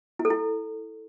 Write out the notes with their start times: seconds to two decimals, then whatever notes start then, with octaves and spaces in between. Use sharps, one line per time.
0.19 E4
0.25 A4
0.30 E4